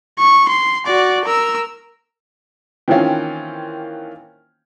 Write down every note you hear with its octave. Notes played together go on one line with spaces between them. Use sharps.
C#6
C6
F#4 D5
A#4 E6
D#3 E3 A#3 C4 C#4 F4